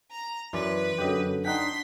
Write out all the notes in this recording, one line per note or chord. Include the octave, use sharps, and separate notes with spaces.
A#5
F#2 E3 B4 D5 C6
F#2 D3 F#3 G4 D#5
D4 D#4 F#5 G5 C6 B6